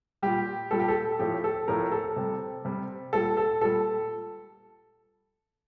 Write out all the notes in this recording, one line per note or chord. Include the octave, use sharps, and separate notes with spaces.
A#2 G3 G4
A#2 G3 A4
G4
A4
A2 F3 G4
A4
A2 F3 A#4
A4
C3 G3
C3 G3
A#2 G3 A4
A4
A#2 G3 A4